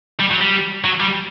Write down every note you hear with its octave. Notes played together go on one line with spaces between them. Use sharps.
G3
F#3
G3
F#3
G3